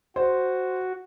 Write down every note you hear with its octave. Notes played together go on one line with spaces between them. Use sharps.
F#4 C5